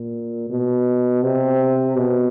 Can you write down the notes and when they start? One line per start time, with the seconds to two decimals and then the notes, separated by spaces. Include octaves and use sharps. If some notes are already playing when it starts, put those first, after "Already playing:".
Already playing: A#2
0.50 B2
1.23 C3
1.96 B2